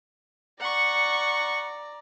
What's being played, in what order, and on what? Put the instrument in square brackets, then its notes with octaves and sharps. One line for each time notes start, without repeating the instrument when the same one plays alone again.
[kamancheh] D5 A#5 [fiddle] F#5 C#6